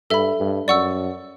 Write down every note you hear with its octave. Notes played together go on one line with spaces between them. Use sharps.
G2 A4 E5 B5
G2
F#2 D5 F#5 C#6 E6